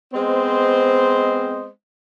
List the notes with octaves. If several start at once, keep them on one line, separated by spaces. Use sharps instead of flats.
G#3 B3 C4 C5 D#5